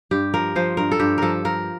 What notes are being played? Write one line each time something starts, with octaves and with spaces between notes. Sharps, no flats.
G2 G4
F3 A#4
F3 C5
G2 A#4
A4
G2 G4
F3 A4 A#4
F3 A#4